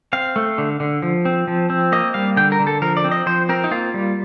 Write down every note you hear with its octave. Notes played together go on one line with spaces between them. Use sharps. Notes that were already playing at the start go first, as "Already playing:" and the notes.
C4 F5
A3
D3
D3
F3
C4
F3
C4
A#3 D#5
G3 F5
D3 G5
A#4
D3
A4
F3 A#4
D5
C4
D#5
F3 C5
C4 A#4
D#4
A#3 F4
G3